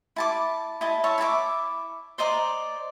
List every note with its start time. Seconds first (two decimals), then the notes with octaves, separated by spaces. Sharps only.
0.16 E4 A5 D6
0.81 E4 D#5 A5
1.04 C#5 E5 A5
1.18 E4 E5 A5 D6
2.18 C5 D5 D#5 A#5